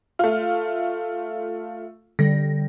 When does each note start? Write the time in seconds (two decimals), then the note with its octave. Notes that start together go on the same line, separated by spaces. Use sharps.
0.19 A3 F4
2.19 D3 G3 A#6